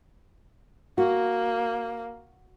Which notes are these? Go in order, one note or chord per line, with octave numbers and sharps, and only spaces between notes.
A#3 F#4